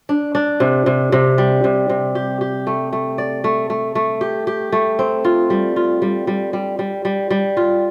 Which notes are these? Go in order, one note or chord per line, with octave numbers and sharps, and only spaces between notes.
D4
D4
C3
C3
C3
G3
C3
C3
G4
G4
A3
A3
D5
A3
A3
A3
G4
G4
A3
C4
F4
G3
F4
G3
G3
G3
G3
G3
G3
F4